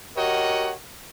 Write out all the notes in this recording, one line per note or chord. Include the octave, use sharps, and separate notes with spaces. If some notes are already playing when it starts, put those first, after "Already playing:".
F#4 G4 A#4 C#5 D#5 F#5